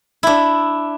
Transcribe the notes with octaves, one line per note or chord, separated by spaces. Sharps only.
D4 E4